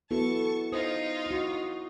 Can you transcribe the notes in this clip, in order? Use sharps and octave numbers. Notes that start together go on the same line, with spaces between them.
B3 E4 F#4 A4 A5 C#6
D#4 F4 C5 D#6
E4 F#4